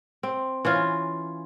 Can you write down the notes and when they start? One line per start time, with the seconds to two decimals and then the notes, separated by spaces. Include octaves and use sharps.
0.23 C4
0.65 E3 C#4 F4